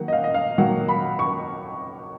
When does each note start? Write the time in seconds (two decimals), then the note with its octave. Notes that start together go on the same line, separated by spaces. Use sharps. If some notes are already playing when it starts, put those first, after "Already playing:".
Already playing: D#3 F#3 A#3 F#5
0.08 D#5
0.13 F5
0.24 D#5
0.34 F5
0.58 D#3 F#3 A#3 F#5
0.88 B5
1.19 C#6